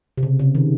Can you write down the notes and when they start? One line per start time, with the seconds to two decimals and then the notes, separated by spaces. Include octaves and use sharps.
0.18 C3
0.23 C#3
0.39 C#3
0.55 D#3